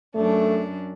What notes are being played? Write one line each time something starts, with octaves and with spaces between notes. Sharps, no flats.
F#2 A3 D4